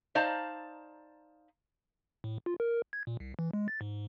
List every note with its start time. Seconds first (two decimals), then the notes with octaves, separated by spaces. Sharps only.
0.15 D#4 C5 D5 F5 A5 A#5
2.24 A2
2.46 F4
2.60 A#4
2.93 G#6
3.07 A#2
3.20 C2
3.39 E3
3.53 G#3
3.68 A6
3.81 G#2